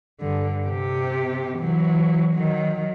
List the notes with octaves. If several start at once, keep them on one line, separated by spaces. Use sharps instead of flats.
G2 D3
C3 G4
E3 F#3
D#3 F#3